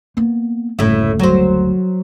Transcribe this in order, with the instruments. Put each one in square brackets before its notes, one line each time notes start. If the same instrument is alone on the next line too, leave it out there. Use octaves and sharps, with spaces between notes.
[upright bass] A#3 B3
[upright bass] F#1 D2 [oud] A2 E4
[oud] F#3 C5